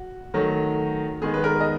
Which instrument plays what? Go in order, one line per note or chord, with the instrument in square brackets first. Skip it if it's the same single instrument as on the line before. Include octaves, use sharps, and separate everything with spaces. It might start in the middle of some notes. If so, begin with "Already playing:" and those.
Already playing: [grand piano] F#4
D#3 F#3 A3
D#3 G#3 B3 G#4
B4
A#4
D#5